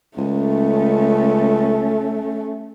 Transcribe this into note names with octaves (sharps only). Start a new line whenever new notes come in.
C#2 A3 C#4